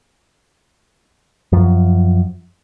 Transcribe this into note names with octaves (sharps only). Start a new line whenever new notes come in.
F#2 F3